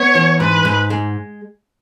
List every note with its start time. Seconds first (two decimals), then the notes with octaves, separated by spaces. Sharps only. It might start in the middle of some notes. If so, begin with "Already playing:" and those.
Already playing: B3 C#5
0.15 E3
0.40 G#2 B4
0.65 G#2
0.90 G#3